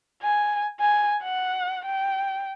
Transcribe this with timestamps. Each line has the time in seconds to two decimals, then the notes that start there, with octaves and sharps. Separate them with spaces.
0.23 G#5
0.80 G#5
1.23 F#5
1.86 G5